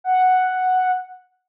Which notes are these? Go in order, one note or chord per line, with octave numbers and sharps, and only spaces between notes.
F#5